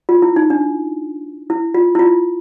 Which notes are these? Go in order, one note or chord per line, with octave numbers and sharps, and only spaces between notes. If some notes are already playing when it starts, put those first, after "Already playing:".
F4
E4
D#4
D4
E4
F4
E4
F4